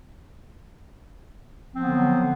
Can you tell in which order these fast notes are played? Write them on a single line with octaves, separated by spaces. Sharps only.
F3 C4 B3 D3 F#3